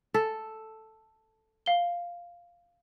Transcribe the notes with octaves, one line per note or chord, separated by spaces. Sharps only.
A4
F5 G7